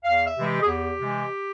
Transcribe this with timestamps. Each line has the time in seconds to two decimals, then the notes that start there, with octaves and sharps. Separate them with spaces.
0.04 E2 F5
0.25 E5
0.36 C3 E3 G#3
0.46 G4
0.62 G#4
0.67 E2 G4
0.99 C3 E3 G#3